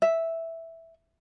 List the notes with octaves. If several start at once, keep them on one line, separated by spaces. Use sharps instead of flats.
E5